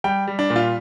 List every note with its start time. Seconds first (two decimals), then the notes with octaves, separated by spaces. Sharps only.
0.04 G3 G5
0.27 G3
0.39 D4
0.50 A#2
0.56 F4